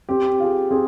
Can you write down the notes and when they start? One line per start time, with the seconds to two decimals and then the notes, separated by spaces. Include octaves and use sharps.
0.09 C4 G4
0.40 F4 G#4
0.71 C4 G#4